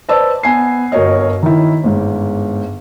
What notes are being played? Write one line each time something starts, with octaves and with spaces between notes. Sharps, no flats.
B4 C5 D5 A5 E6
B3 G#5 C7
G1 F#4 A#4 C#5 D#5
D#3 E4
G1 G#2